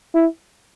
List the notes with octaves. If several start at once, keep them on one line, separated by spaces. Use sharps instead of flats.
E4